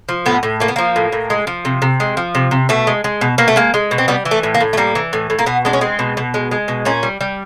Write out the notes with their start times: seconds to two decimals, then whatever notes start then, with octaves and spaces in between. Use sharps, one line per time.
0.09 F3
0.26 A2 B3
0.43 A2
0.60 A3 A#3
0.68 B3
0.76 F3 A#3
0.96 A2
1.12 A2
1.30 G#3
1.47 F3
1.65 C3
1.82 C3
2.00 G#3
2.17 F3
2.35 C3
2.51 C3
2.69 B2 A3
2.87 G#3
3.04 G#3
3.21 B2
3.38 B2 A#3
3.48 A3
3.56 G#3 A#3
3.74 G#3
3.91 B2
3.98 C4
4.08 G3 B3
4.25 E3
4.31 A3
4.43 A2
4.55 A#3
4.60 A2
4.73 A3
4.77 G3 A#3
4.95 E3
5.13 A2
5.30 A2
5.39 A#3
5.46 B2 B3
5.65 G#3 D4
5.73 C#4
5.81 G#3 C4
5.99 B2
6.17 B2
6.34 G#3
6.51 G#3
6.68 B2
6.85 A#2 C#4
7.03 G3
7.21 G3